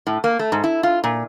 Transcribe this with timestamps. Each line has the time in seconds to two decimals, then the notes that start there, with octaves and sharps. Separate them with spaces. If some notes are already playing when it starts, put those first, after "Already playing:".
0.07 A2
0.24 A#3
0.39 A3
0.52 G#2
0.64 E4
0.83 F4
1.04 A#2